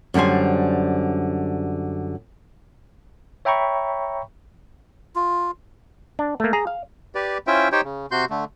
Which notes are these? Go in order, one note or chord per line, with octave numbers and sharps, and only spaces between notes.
F#2 D3 G3 C5 G#5
C#5 E5 G5 A#5 B5 C#6
F4
D4
A3 A#3
G#4 A#5
F5
G4 B4 D5
C#4 E4 F4 C5 E5 G5
D#4 G4 C5 C#5 G5
C#3
C3 F#4 C6 G6
D3 A3